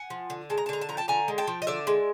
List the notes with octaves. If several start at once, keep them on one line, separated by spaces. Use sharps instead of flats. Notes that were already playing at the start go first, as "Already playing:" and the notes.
Already playing: F#5 G#5
F3
D3
G#3 A5
A#5
A5
D3 A#5
A5
F3 A#5
G5 A5
D3 G#5 A#5
G#3
G5 A5
F3
D#5
D3 D5 E5
G#3